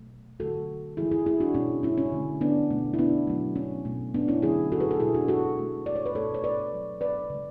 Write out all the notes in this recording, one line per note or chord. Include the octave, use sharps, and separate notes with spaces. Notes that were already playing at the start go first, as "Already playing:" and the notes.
Already playing: B2 F#3 A3
D3 F#3 A3 F#4 A4
C#3 E3 G#3 E4 G#4
E4 G#4
E4 G#4
D4 F#4
B2 G#3 C#4 E4
C#4 E4
C#4
D3 A3
B3 D4
B2 A3
E4
B3 D4
B2 F#3 A3
C#4
B2 A3
B3 D4
C#4 E4
D3 F#3 A3 E4 G#4
F#4 A4
G#4 B4
F#4 A4
B2 G#3 E4 G#4
D4 F#4
F#4 A4
B2 A3
D5
C#5
B4
B2 A3 A4 C#5
C#5
B4 D5
C#3 F#3 A3
B4 D5
C#3 G#3